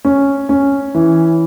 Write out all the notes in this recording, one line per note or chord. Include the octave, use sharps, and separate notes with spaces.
C#4
C#4
E3